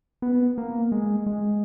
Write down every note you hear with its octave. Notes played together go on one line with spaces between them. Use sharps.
B3
A#3
G#3
G#3